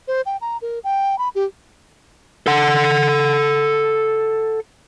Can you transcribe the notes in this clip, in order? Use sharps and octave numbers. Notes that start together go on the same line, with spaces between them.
C5
G5
A#5
A#4
G5
B5
G4
A4 F#5